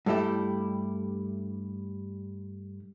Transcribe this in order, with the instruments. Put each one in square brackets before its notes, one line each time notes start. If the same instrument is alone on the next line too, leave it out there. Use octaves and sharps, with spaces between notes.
[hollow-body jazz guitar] G2 G3 A3 E4 G4